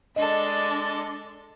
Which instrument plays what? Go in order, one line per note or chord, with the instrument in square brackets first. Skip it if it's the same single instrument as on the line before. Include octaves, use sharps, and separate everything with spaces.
[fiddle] G#3 A4 [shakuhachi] D4 [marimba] D#5